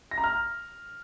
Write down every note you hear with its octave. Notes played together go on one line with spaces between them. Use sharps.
A#6
A#5
F6